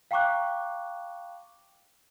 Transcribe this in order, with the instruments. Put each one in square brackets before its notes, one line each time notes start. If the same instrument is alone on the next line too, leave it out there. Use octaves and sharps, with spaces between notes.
[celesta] F5 G5 A#5 C#6 D6 F#6